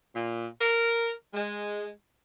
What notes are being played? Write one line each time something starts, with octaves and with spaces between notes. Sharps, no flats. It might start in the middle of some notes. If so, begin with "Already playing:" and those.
A#2
A#4
G#3